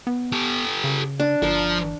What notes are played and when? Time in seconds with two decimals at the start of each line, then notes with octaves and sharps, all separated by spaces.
0.07 B3
0.32 G4 A4
0.84 C#3
1.20 D4
1.42 G1 F3 A#4